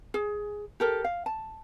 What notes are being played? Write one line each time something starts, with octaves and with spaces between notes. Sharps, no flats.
G#4
G4 A4 A#4
F5
A5